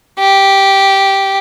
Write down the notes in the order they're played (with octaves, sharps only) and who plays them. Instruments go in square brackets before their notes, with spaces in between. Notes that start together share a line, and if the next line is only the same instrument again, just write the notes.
[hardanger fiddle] G4